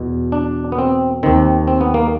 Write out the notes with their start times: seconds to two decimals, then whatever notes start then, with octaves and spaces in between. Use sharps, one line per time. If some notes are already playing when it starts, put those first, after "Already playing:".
Already playing: E2 B2
0.32 D4
0.72 B3
0.79 C4
1.23 D#2 D#3 C4
1.68 C4
1.81 B3
1.94 A#3